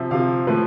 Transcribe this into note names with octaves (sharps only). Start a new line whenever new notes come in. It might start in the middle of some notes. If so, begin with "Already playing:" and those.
Already playing: C3 F3 E5
C3 F3 F5
A2 F3 B4